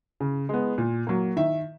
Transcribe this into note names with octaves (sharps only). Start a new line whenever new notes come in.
C#3
G#3 B3
A#2
F#3 A#3
D#3 E5